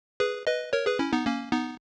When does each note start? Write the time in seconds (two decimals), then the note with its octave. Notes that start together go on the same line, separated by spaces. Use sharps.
0.20 G#4 B4
0.47 B4 D#5
0.73 A#4 C#5
0.86 G#4 B4
0.99 C#4 E4
1.13 B3 D#4
1.26 A#3 C#4
1.52 B3 D#4